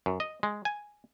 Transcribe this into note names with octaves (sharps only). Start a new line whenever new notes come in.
F#2
D#5
G#3
G#5